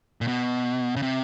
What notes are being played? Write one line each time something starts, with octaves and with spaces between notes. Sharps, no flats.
A#2
B2
C#3
C3